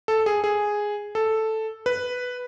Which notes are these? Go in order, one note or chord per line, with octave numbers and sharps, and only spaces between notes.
A4
G#4
G#4
A4
B4